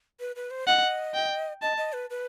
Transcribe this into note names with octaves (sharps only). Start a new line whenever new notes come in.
B4
B4
C5
D#5 F#5
G5
D#5 A5
D#5
B4
B4